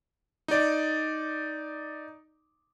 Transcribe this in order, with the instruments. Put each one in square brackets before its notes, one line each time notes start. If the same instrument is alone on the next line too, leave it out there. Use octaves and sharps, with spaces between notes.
[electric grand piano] D#4 D5